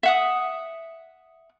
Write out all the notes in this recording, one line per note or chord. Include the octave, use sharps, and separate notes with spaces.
E5 F#5 D#6